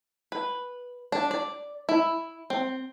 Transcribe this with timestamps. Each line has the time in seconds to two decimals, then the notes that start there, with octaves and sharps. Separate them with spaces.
0.32 B4
1.12 D4
1.31 D5
1.89 E4
2.50 C4